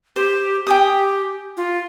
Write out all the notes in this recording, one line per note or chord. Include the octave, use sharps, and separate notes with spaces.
G4 C5
G4 G5 G#5 D#6
F4